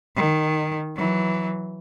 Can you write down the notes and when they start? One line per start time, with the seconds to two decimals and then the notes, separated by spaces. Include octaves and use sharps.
0.16 D#3
0.96 E3 F#3